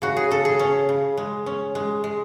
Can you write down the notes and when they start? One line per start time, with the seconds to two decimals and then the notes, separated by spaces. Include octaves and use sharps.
0.02 C#3 F#4
0.17 G#4
0.31 C#3 A4
0.45 G#4
0.59 C#4
0.89 C#3
1.17 G#3
1.46 C#4
1.75 G#3
2.04 G#3